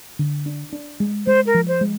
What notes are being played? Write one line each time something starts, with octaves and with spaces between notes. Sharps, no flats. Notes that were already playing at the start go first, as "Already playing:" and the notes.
D3
D4
D4
G#3
G#3 C5
A#4
F3
C5
G#3